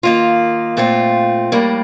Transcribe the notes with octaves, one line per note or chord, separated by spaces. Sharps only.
D#3 A#3 F4
A#2 A3 C4 F4
A2 G3 A#3